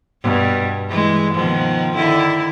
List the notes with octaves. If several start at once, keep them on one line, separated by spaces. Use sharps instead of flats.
G2 B2
E3 G#3
B2 D#3 F3
D3 D#3 E4